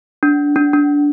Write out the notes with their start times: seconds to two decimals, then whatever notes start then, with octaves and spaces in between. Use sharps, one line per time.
0.23 D4
0.56 D4
0.73 D4